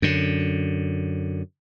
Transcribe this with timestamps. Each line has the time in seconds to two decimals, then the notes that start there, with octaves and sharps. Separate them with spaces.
0.02 F#2 D3